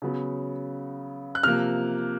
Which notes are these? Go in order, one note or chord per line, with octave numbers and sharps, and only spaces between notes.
C#3 F#3 B3
F#6
C3 F3 A#3 F6